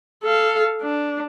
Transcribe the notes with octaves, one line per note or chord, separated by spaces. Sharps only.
A4 F5
D4